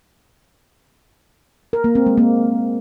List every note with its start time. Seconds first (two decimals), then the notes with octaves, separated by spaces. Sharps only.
1.73 A#4
1.84 A#3
1.95 C4
2.06 G#3
2.18 A#3